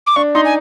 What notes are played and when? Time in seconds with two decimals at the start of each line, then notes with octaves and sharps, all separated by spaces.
0.07 D6
0.16 D4 C#6
0.35 D#4 C6
0.45 G#5